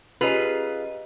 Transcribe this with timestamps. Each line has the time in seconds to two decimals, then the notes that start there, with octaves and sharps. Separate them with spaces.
0.21 C#4 F4 G4 G#4 B4 D#5